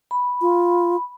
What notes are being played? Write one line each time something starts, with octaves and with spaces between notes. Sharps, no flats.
B5
F4